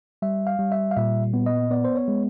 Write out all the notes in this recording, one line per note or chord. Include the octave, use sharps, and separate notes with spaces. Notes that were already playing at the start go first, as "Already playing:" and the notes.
G3 E5
F5
G3
E5
F5
A#2 E5
B3
D#5
B3 D5
C5
C#5
G#3